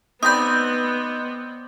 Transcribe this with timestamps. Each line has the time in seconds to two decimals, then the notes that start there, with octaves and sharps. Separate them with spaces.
0.23 B3 C4 D#4 D5 B5 D#6 G6